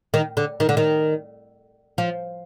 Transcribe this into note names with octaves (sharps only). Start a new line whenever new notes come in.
D#3
D3
D#3
D3
D#3
F3